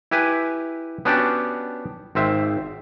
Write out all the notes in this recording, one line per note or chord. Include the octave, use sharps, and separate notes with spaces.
E4 G4 B4 G#5
B3 C#4 D4 F#4 G4 D5
G#1 C4 E5